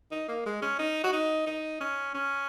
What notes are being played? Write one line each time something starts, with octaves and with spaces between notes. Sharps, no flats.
D#4
A#3
G#3
C#4
D#4
F#4
D#4
D#4
C#4
C#4